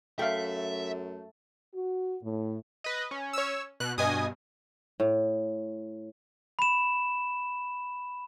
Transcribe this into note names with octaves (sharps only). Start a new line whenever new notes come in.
F#2 A3 E5 F5 G5
F#4
A2
B4 D#5
C#4
C#5 E6
B2 F#6
G2 B2 D#5 G#5 D#6
A2
B5 E7